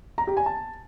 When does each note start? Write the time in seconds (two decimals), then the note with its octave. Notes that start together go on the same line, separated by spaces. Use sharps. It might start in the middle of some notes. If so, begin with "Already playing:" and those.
0.18 A#5
0.27 G4
0.37 G#5
0.46 A5